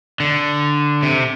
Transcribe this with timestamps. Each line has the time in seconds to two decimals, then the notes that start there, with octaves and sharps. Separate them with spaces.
0.20 D3
1.03 C3